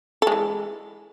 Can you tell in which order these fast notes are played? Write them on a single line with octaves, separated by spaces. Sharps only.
A4 G#3 E3